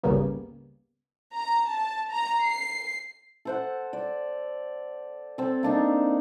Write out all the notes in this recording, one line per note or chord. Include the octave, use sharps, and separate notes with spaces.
G#1 C#2 C#3 G3 A#3 B3
A#5
A5
A#5
C7
A4 C5 F#5
D5
C4 A4
A#3 D4 D#4